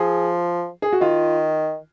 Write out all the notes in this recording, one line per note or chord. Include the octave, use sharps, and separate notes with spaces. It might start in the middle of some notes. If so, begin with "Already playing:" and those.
Already playing: F3 G#4
G#4
F#4
D#3 F4